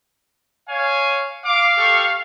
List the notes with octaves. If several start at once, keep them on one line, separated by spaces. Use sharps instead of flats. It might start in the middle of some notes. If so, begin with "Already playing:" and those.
C#5 F5 G#5
F5 D6
G4 A4 C#6